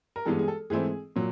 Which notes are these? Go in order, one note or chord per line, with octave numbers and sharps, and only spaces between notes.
A#4
G2 E3 G#3 B3 A4
G#4
A4
G#2 E3 A3 C4 E4 G#4
A#2 F#3